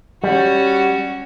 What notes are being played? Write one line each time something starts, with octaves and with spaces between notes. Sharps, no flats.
G3 C#4 F#4